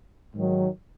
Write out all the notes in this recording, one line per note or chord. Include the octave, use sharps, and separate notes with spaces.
G#2 D#3 F#3